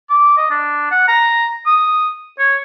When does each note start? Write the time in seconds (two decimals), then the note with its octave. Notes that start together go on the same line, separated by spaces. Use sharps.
0.10 D6
0.37 D#5
0.50 D4
0.91 F#5
1.08 A#5
1.66 D#6
2.39 C#5